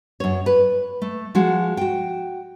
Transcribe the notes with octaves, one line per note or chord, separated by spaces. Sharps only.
F#2 C#5
B4
A3
F3 G#3 F#4 F#5
F#4 G5